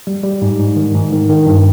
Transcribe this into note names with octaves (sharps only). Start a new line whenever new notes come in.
G3
G3
G#2
G#2
D#3
G#2
D#3
D#3
G2